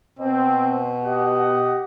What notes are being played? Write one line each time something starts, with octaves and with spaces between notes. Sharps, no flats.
B2 C4
G4 D#5 F#5